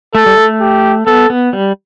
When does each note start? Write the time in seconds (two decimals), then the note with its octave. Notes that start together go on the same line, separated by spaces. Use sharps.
0.15 A3 A4
0.26 G3
0.37 A3
0.61 G4
1.06 B3 A4
1.30 B3
1.53 G3